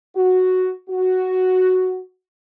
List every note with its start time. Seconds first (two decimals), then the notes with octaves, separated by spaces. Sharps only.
0.15 F#4
0.89 F#4